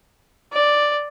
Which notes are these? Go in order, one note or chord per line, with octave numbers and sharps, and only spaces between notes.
D5